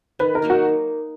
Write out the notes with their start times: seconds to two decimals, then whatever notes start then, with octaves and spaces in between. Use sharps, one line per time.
0.19 D#3 B4
0.35 A#4
0.42 F#3 A#3 D#4
0.50 F#4